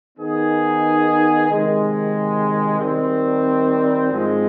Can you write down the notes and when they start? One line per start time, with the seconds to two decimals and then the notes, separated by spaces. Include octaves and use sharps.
0.17 D#3 B3 D#4 G#4
1.48 C3 D#3 G#3
2.79 D#3 G3 C4
4.10 G#2 F3 G#3 C4